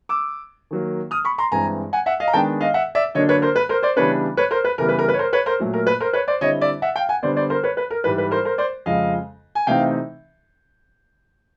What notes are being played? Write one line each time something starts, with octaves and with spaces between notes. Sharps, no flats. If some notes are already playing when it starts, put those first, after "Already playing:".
D6 E6
D#3 F#3 A#3
D#6 F6
B5 C#6
A#5 C6
G2 E3 G#3 C4 G#5 A#5
F#5 G#5
E5 F#5
D#5 F5
A#5
D#3 G#3 B3 D4 G5 A5
D#5 F5
E5 F#5
D5 E5
D3 F#3 A#3 D4 C#5 D#5
B4 C#5
A#4 C5
B4
A#4 C5
C5 D5
C#3 E3 G3 B3 D4 B4 C#5
B4 C#5
A#4 C5
B4
C#3 E3 G3 B3 A#4
B4
A#4
B4
C#5
A#4 C5
B4 C#5
A#4 C5
A#2 F#3 A3
A#4
B4
A#4 C5
B4 C#5
C5 D5
D3 G3 C4 E4 C#5 D#5
D5 E5
E5 F#5
F5 G5
F#5 G#5
D3 G3 B3 C5 D5
C5 D5
A#4 C5
B4 C#5
B4
A#4
G#2 E3 G3 B4
B4
A#4 C5
A#4 C5
C5 D5
F2 C#3 F3 G#3 D#5 F5
G#5
C3 E3 A3 C4 D#4 F5 G5